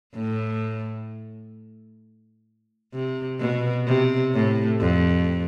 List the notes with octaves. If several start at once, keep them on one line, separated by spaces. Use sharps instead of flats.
A2
C3
B2
C3
A2
F2